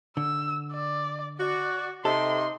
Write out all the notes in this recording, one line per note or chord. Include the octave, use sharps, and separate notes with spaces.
D3 E6
D5
F#4 D5
C3 D#4 A4 C6